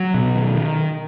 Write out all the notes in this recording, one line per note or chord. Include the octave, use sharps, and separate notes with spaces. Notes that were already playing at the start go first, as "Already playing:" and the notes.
Already playing: F#3
B2
D#3
D#3